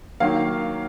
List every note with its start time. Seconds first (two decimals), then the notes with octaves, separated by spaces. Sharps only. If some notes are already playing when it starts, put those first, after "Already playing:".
0.20 D#3 F#3 A#3 F5